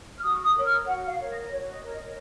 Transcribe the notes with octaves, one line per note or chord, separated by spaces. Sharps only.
F6
F#4 D#6
D#6
A#4 C#5
F6
F#4 F#5
F5
A#4 C#5
D#5
F#4 C#5
D#5
A#4 C#5
D#5